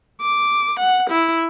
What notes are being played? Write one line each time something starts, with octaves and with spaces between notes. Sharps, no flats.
D6
F#5
E4